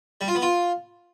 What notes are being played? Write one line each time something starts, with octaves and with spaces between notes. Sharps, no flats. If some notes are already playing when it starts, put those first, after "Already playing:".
G3
F4
B3
F4